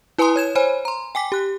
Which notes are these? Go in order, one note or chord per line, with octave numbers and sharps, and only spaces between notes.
E4 B4 G#5 A#5 C6 D#6
C#5 G#6 E7
C5 C#5 G#5 B5
A#5 C6
G5 G#5 D6 B6
G4 F#6